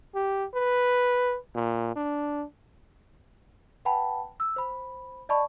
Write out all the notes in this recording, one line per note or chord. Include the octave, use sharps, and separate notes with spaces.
G4
B4
A#2
D4
B4 F#5 G5 A5 B5
E6
C5 B5
D5 D#5 A5 B5 C#6